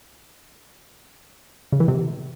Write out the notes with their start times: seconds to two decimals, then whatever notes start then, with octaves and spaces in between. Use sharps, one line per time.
1.72 C#3
1.80 E3
1.88 C3